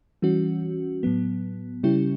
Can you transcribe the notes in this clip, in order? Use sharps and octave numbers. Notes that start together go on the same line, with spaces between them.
E3 G3 C#4 F#4
A2 F#3 B3
C#3 G3 C#4 E4 G4